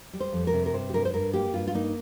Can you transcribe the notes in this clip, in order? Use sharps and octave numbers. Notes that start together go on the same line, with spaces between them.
G3
C5
F2
A#4
C3
A#4
G2 C5
G4
G2 A#4
C5
G2 A#4
A#3 G4
G2 F4
F4
A#3 D#4